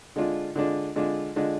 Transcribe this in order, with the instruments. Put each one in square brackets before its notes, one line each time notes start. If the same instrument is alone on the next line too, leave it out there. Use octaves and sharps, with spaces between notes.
[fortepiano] D3 G#3 D4 F4
D3 G#3 D4 F4
D3 G#3 D4 F4
D3 G#3 D4 F4